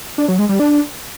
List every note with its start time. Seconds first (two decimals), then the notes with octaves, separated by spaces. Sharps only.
0.18 D4
0.28 F#3
0.39 G#3
0.49 G3
0.59 D4